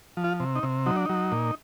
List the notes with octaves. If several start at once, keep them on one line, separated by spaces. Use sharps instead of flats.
F3
F4
C3
D#4
C3
F#3 D#4
D4
F#3 D#4
A#2